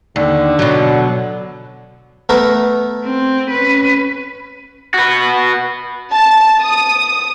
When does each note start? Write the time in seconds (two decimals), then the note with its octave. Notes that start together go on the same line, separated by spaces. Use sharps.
0.16 D#2 D3
0.59 B2 F#3
2.29 A3 B3 A#4
3.04 C4
3.50 C#4 B4
4.94 F#4 B4
6.12 A5
6.62 D#6